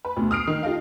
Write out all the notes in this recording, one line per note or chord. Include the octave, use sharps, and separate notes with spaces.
B4
D2 B2
D#6 F6 C7 D7
D#3
F4 G4 A4 D#5 F5